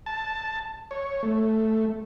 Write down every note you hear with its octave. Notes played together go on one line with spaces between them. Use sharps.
A5
C#5
A3